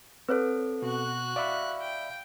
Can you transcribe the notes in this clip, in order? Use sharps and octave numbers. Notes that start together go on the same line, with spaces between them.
C4 A4 B4 C#5
B2 F#4 F#6
D5 E5 F5 B5
G5